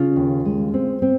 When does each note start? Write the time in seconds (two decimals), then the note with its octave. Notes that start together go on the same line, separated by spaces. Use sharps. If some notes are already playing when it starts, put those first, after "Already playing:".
Already playing: C#3 F4
0.16 D#2
0.45 G#3
0.74 C4
1.02 C4